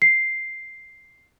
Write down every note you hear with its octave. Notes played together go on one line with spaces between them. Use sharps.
C7